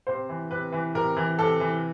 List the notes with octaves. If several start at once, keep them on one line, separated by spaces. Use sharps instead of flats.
C3 C5
E3
C3 B4
E3
C3 A#4
E3
C3 A4
E3